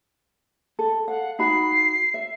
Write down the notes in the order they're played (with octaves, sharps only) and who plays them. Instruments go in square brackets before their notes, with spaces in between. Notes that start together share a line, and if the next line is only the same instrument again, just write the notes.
[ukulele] A4
[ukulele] F5 [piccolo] F#5
[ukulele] D#4 F#4 B5 [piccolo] C7
[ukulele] E5